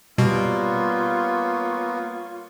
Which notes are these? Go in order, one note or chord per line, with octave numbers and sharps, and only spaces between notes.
B2 G3 A#3 B3 F4 C#5